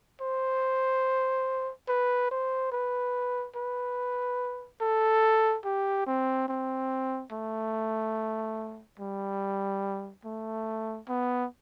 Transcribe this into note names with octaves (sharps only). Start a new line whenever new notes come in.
C5
B4
C5
B4
B4
A4
G4
C4
C4
A3
G3
A3
B3